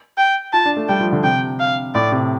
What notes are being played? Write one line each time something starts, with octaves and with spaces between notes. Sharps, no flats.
G5
F4 A5
D4
A3
G3 G5
F3
D3
C3 G5
F5
A2 D5
C3